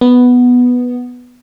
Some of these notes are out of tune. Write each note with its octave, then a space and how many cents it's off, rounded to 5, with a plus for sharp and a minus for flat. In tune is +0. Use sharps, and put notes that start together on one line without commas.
B3 +0